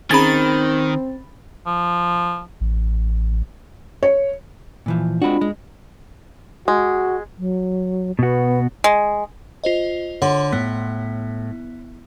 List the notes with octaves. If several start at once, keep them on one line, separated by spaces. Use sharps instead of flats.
D#3 C4 C#4 G#4 A#5 B5 A6
F3
A1
C#5
A#2 E3 F3
G#3 C4 D4 F4 F#4 B5
G#3
G#3 F#4
F#3
B2 B3 F#4
G#3
F4 C5 D#5
D3 C#5 F#5 C6
A2 B3